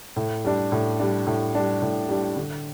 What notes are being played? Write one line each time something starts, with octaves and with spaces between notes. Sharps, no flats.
A2
G3 D4
A2
G3 D4
A2
G3 D4
A2
G3 D4
D3